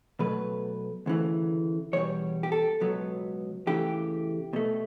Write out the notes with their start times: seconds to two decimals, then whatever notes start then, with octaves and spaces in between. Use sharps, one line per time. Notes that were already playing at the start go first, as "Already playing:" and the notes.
0.19 B2 F#3 A3 B4
1.06 D2 C#3 E3 A3
1.93 E2 B2 G3 C#5
2.43 G4
2.52 A4
2.80 C#2 B2 F#3 B3
3.67 E2 C#3 E3 A3 G4
4.53 B2 A3